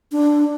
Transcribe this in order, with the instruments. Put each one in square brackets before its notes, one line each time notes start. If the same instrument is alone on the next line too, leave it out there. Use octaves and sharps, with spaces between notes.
[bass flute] D4